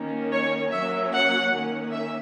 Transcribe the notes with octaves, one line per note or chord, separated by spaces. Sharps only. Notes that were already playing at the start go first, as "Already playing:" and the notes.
Already playing: D#3 A#3 C#4
C#5
F#3 A#3 C#4 E5
F#5
D#3 A#3 C#4
E5